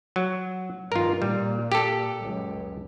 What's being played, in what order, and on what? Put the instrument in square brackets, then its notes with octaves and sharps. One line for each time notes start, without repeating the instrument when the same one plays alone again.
[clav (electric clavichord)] F#3
[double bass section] G2 D#3 [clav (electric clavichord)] F4 A#4
[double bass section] A#2 [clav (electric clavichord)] G3
[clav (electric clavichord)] G4 A4
[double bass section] C#2 F#2